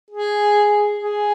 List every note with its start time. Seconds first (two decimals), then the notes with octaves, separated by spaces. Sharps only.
0.11 G#4
0.99 G#4